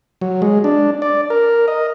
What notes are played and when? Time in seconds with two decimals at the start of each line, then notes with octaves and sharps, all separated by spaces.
0.21 F#3
0.42 G#3
0.64 D4
1.02 D5
1.30 A#4
1.68 D#5